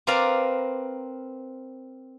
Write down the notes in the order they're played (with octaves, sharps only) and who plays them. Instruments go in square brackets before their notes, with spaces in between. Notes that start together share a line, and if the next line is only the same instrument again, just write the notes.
[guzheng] C4 A#4 B4 D5 F5 A#5